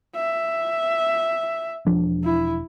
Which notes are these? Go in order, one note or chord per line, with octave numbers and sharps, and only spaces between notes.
E5
E1 F3 D4
E4